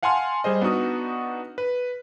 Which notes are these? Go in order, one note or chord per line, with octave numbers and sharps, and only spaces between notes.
F5 F#5 G#5 A5 C6 F6
G3 G#4 C5 D#5
B3 D4 D#4 F#4 D#6
B4